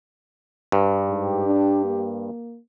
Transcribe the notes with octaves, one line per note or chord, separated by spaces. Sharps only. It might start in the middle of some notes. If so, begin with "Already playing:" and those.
G2
G#2 G4
D4
A#3